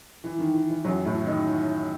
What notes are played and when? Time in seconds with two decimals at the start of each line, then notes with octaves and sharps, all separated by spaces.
0.24 E3
0.39 D#3
0.54 E3
0.69 E3
0.85 F#2 F#3
1.05 A2 A3
1.26 D#3 D#4